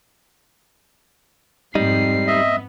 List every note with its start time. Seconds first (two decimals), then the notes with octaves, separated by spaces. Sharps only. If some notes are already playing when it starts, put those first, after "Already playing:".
1.75 F2 G#2 G3 C4 D#4 C7
2.27 B3 D#5 E5